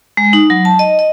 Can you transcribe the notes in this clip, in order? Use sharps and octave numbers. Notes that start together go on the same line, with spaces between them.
G#3
D#4
F#3
A5
D#5
D#5